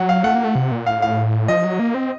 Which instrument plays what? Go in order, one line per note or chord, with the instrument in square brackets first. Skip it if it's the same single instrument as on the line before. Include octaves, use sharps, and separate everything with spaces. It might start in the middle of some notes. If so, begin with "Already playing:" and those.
Already playing: [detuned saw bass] F#3 [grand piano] F#5
[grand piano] F5
[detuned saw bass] A3 [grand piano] F#5
[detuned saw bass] A#3
A3
C3
A#2
[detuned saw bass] A2 [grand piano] F5
[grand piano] F5
[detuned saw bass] F3 [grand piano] D#5
[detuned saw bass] F#3
A#3
C4